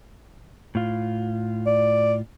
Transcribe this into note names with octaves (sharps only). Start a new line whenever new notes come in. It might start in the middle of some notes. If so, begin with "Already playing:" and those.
A2 F4
D5